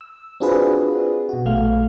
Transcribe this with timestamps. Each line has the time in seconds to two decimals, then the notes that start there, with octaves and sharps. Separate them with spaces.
0.01 E6
0.40 C4 D4 F4 F#4 G#4 B4
1.29 B2 F#4
1.45 A#1 A3 F5 F6